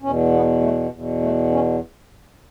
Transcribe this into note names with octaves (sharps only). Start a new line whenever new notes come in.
E2 B2 C#4
B3
A3
E2 B2
A3
C#4